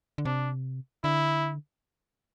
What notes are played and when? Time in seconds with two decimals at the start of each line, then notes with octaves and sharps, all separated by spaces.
0.18 D3
0.25 C3 D4
1.04 D3 E4